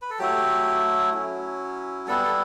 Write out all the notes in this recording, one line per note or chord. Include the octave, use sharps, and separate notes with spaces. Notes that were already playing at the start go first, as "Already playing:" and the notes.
B4
A4
F#3 A3 E4 G4
F#3 C#4 E4
G3 B3 E4 A4
A4